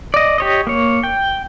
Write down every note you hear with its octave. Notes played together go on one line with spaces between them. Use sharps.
D5 D#5
G4 C#5 D#5
A#3 C#5
G5